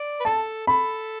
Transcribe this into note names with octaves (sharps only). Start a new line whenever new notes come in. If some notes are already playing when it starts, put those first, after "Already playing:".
Already playing: D5
B4
A4 A5
A4 B5